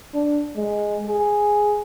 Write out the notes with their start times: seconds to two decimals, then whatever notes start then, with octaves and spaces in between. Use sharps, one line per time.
0.14 D4
0.56 G#3
1.07 G#4